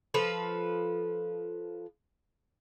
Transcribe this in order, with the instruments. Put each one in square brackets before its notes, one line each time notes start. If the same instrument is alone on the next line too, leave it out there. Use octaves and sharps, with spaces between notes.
[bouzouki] F3 A4 B4